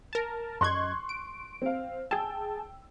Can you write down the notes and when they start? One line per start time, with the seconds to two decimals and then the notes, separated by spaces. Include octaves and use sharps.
0.13 A#4 A5
0.61 F#2 D#5 C6 C#6 F#6 G#6
1.09 D7
1.62 C4 F5
2.11 G#4 G5 A5 E6